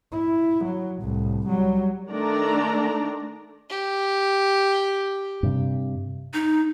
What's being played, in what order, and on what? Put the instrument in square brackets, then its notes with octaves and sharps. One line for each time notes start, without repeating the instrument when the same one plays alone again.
[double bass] E4
F#3
C2 A2
F#3 G3
[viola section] D#3 A3 D4 D5 A#5
[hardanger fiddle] G4
[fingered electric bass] G2 C3
[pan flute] D#4